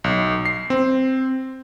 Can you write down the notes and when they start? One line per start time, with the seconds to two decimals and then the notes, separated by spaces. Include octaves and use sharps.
0.04 B1
0.46 C7
0.70 C4